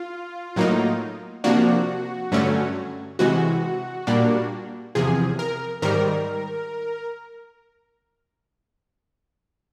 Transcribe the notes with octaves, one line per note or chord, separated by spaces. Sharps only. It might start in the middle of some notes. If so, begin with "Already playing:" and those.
Already playing: F4
A2 F#3 A#3 D#4
C3 F3 A#3 D4 F#4
G2 D3 F#3 A3 C#4
C3 E3 G#3 F#4
A#2 G3 A#3 D4
E2 C3 F3 G#4
A#4
G#2 D#3 G3 A#4